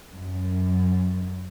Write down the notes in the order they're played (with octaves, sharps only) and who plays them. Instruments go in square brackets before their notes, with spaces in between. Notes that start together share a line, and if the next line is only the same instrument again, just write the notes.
[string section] F#2